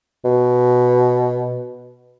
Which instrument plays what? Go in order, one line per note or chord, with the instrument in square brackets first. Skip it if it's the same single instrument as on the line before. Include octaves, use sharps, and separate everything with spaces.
[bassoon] B2